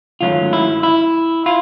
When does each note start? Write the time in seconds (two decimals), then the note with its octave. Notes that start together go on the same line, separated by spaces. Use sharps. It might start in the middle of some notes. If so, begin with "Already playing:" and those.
0.21 G#2 D#3 F#3 A3 C#4 F4
0.53 E4
0.83 E4
1.46 E4 F4